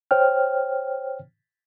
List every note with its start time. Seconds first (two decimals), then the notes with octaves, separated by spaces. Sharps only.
0.11 C5 C#5 G5 F6